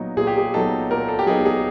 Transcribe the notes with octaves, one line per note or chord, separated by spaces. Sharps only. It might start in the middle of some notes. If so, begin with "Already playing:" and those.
Already playing: A#2 F#3 B3 D#4
A#2 G#4
G4
G#4
F#3 B3 D#4 A4
A#2 A#4
A4
G4
F#3 B3 D#4 G#4
G#4